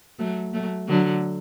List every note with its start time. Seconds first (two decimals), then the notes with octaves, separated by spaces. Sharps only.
0.19 F#3 A3
0.54 F#3 A3
0.88 D3 F#3